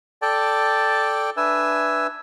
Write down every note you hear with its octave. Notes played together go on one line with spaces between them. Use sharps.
A4 D5 G5 A5
D4 B4 E5 G#5 E6